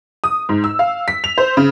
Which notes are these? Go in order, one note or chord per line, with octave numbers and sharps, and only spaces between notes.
D#6
G#2
E6
F5
B6
F7
C5
C#3